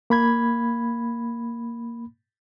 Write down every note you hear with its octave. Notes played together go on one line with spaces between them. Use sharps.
A#3 B5 G#6